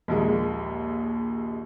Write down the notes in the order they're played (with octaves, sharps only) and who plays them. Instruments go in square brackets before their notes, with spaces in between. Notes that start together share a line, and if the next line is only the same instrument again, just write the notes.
[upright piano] A#1 D#2 G#3